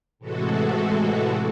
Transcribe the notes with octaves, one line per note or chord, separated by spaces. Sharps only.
A2 C3 E3 G#3 F#4 A4